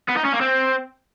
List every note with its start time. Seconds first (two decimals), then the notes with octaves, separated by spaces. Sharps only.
0.09 B3
0.17 D#4
0.25 C#4
0.33 A#3
0.41 C4